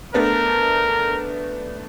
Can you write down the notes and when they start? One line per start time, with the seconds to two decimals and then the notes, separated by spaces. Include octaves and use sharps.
0.14 A3 B3 D4 A#4